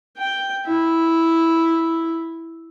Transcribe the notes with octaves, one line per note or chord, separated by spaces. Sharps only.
G5
E4